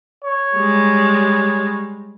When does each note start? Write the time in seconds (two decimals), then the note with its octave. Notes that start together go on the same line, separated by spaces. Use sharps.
0.25 C#5
0.56 G3 G#3